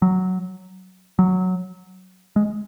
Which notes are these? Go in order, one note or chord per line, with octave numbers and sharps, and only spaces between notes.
F#3
F#3
G#3